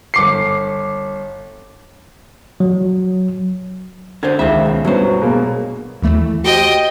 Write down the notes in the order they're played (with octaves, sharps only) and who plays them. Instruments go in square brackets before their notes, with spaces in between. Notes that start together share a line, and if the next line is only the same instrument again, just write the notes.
[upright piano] G1 D6 C7
[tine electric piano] F#3
[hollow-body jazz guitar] D3 C5 [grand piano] G#6
[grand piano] C#2 D#3 [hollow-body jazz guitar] C5 E5
[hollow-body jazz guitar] B1
[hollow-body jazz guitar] G2 B2 C5 [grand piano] F#3 B3
[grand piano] B2 G#3 A#3
[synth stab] D#2 E3 A3
[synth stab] F#4 G4 C5 [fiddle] D#5 G5